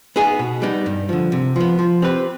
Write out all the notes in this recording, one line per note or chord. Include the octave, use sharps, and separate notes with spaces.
B3 D#4 G#4
B2
G3 B3 D#4
G2
D3 F3
C3
F3 B3
F3
C4 G4 B4